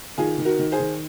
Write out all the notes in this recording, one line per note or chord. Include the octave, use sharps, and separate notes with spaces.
D#3 F4 G#4
D#3
F#4 A#4
D#3
G#4 C5
D#3